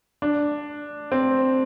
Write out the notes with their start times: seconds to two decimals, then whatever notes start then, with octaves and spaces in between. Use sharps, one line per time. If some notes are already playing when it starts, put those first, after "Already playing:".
0.22 D4
1.12 C4